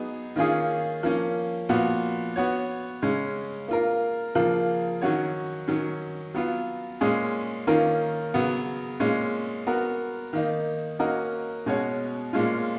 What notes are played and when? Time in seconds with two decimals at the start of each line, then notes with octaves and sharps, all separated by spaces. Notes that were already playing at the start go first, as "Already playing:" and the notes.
Already playing: F#3 B3 D#4 G#4
0.36 D#3 A#3 C#4 F4 G#4
1.03 F3 A#3 C#4
1.69 A#2 F3 B3 F#4
2.36 B3 F#4 C#5
3.02 C#3 G#3 C#4
3.68 A#3 F4 A#4
4.35 C#3 F3 A#3 F4 A#4
5.01 D#3 F#3 C#4 F#4 C#5
5.68 D#3 F#3 C#4
6.34 F#3 B3 F4
7.01 A#2 G#3 C#4 G#4
7.67 D#3 A#3 C#4 F4 A#4
8.34 C#3 F#3 B3
9.00 A#2 G#3 C#4
9.67 B3 F#4 A#4
10.33 D#3 A#3 D#4
10.99 A#3 C#4 F#4 A#4 D#5
11.66 B2 G#3 C#4 F#4 C#5
12.33 A#2 G#3 C#4 F4